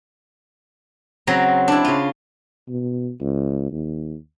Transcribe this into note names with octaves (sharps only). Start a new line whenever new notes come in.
C#3 F#3 C4 A#5 B5
D4 E4
C#3 F4
B2
C#2
D#2